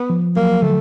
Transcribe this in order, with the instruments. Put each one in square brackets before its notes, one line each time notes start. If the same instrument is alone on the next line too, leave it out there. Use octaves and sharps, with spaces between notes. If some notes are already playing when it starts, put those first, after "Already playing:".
Already playing: [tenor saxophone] B3
[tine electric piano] F3
[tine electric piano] F#3 [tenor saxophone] A#3
[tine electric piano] D3 [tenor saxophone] A3